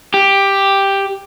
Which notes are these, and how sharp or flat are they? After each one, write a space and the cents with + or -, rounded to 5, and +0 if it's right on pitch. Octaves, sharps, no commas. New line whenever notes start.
G4 +5